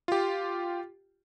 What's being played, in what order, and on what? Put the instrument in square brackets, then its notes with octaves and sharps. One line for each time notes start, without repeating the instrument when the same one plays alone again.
[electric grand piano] F4 G4